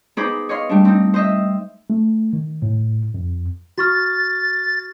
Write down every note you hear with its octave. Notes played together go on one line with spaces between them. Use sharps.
B3 D#4 G#4 C5 B5 D6
C#5 D#5 F5 C6
G3 A3 D4
C4 D#4
C5 D#5 E5
A3
D#3
A2
F2
F#4 C#6 F6 A6